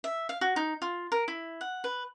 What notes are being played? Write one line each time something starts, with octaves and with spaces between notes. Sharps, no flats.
E5
F5
F#4
D#4
F4
A#4
E4
F#5
B4